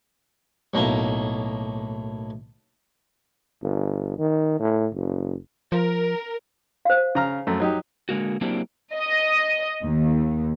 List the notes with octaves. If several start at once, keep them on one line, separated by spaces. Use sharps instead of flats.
B1 A2 A#3
G1
D#3
A2
F#1
F3 A#4
C5 F5
C#3 A#5 F6
F#2 A3
F#3 D#4 G4
D3 G#3 A#3 F#4
F#3 A#3 C4 D4 E4 G4
D#5
D#2